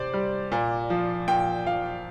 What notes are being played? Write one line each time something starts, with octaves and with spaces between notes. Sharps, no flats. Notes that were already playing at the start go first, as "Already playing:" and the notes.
Already playing: C3 C5 D5
G3
A#2
F3
A#2 G5
F3 F5